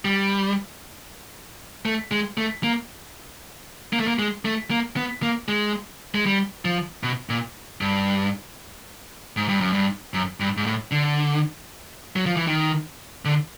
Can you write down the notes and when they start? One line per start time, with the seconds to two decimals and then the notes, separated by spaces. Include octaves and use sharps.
0.05 G3
1.85 A3
2.11 G#3
2.37 A3
2.64 A#3
3.93 A#3
4.00 A3
4.07 A#3
4.19 G#3
4.45 A3
4.71 A#3
4.96 B3
5.22 A#3
5.48 G#3
6.15 G#3
6.26 G3
6.65 F3
7.03 B2
7.29 A#2
7.81 G2
9.37 G#2
9.48 G2
9.61 F#2
9.73 G2
10.14 F#2
10.40 G2
10.57 G#2
10.66 A2
10.91 D3
12.16 F#3
12.26 F3
12.36 E3
12.47 D#3
13.25 D3